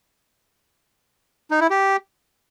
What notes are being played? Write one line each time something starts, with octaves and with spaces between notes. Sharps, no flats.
D#4
E4
G4